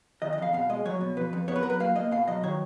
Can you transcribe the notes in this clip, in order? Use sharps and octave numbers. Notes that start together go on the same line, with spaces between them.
D#3 D#5
D#5
F2 F5
B2 F5
G#3 D#5
F#3 C#5
B2
F2 B4
F2
B3 C#5
B4
F#3 A#4
B4
A#3 F5
A#3 D#5
B2 F5
F#3 D#5
D#3 C#5